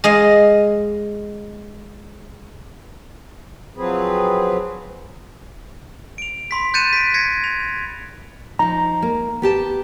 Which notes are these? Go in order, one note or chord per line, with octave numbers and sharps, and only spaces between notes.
G#3 D#5 F5
F3 F#3 C4 G#4 B4
D7 F7
B5 C6 B6
F#6 G6 A6 C#7 D#7 E7
B6 D7
G#6 A#6 B6 C#7
F7
F3 D#4 A#5
A#3
B3 G4 A5